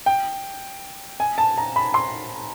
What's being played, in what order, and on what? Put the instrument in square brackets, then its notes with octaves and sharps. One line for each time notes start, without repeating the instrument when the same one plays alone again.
[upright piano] G5
G#5
A5
A#5
B5
C6